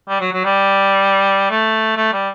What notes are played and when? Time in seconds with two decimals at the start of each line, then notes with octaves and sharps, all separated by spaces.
0.09 G3
0.20 F#3
0.32 F#3
0.44 G3
1.50 A3
1.97 A3
2.13 G3